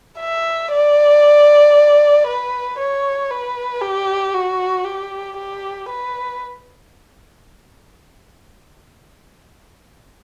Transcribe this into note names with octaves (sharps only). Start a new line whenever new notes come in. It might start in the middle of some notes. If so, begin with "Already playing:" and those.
E5
D5
B4
C#5
B4
G4
F#4
G4
G4
B4